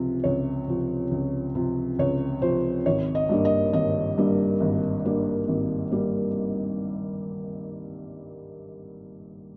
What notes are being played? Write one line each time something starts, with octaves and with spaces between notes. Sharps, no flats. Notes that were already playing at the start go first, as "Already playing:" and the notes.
Already playing: C#2 C3 F3
C#2 C#5
C3 F3
C#2
C3 F3
C#2 C#5
C3 F3 C5
G#1 C#5
D#5
G2 G3 A#3
D#5
G#1 D#5
G2 G3 A#3
G#1
G2 G3 A#3
G#1
G3 A#3